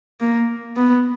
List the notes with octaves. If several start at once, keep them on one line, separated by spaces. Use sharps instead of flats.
A#3
B3